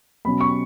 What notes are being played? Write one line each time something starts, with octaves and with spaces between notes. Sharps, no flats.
B2 F#3 C#4 B5
C#6